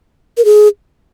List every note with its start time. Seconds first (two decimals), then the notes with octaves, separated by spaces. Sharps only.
0.37 A#4
0.45 G#4